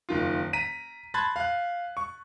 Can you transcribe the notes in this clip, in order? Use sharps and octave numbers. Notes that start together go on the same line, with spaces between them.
F#1 D#3 F4
A#5 B6 D#7
A5 B5 C6 F#6 G#6 A6
F5 F#6
C#6